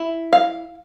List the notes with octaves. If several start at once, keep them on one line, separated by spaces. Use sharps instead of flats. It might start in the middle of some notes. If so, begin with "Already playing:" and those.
Already playing: E4
F5